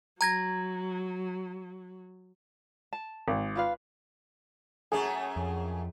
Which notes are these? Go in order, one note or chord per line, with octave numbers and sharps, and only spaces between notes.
F#3 A#5 G#6 A#6
A5
G#1
F4 B4 F5
F#2 A3 C#4 G#4
F2